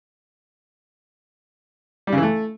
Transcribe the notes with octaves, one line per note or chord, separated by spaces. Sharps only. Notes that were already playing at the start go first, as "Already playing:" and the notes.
G3
C#3
E3
A3